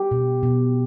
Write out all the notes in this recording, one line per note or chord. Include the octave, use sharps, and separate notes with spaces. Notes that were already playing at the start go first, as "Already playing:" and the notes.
Already playing: G4
B2
B2